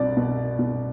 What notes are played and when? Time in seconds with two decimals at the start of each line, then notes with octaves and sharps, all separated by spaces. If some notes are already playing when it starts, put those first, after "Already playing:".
Already playing: C2 B2 D5
0.17 B2
0.59 B2